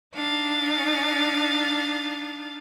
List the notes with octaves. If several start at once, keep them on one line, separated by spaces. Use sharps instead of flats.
D4 D#4 F5 A6